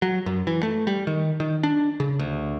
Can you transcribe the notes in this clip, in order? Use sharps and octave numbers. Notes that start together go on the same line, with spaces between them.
F#3
F#2
E3
A3
G3
D#3
D#3
D4
C#3
D2